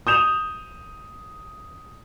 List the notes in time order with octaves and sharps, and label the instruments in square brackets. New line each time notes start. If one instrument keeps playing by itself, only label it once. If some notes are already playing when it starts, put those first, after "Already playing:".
[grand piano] D#6 G6 E7 F7